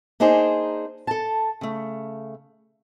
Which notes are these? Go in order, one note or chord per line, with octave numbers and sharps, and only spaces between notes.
A#3 D4 D#4 G#4 C5
A4 A5
C#3 A3